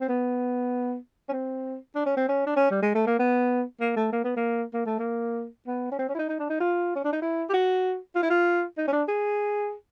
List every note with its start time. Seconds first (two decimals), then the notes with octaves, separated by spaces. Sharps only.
0.01 C4
0.09 B3
1.29 C#4
1.33 C4
1.95 D4
2.06 C#4
2.17 C4
2.29 C#4
2.47 D4
2.57 C#4
2.71 G3
2.82 G#3
2.95 A3
3.07 A#3
3.19 B3
3.80 A#3
3.97 A3
4.12 A#3
4.24 B3
4.37 A#3
4.74 A#3
4.86 A3
4.99 A#3
5.67 B3
5.92 C#4
5.99 C4
6.09 C#4
6.15 E4
6.19 D#4
6.29 D#4
6.40 D4
6.50 D#4
6.60 F4
6.96 C#4
7.04 D4
7.13 D#4
7.22 E4
7.49 G4
7.53 F#4
8.15 F4
8.23 E4
8.30 F4
8.78 D#4
8.88 C#4
8.92 D4
9.08 G#4